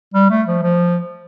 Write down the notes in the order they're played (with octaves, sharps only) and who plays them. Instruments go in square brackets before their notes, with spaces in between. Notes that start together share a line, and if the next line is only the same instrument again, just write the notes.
[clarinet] G3
A3
F3
F3